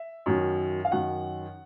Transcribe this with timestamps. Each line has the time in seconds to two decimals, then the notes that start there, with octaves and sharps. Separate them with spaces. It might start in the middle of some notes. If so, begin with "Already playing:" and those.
Already playing: E5
0.26 F#2 D#3 F#3
0.85 F5
0.92 F#2 D#3 F#3 F#5